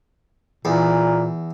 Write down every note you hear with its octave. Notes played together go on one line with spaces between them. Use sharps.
E2 A#2